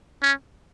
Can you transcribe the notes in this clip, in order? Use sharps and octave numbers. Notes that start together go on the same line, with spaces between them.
C#4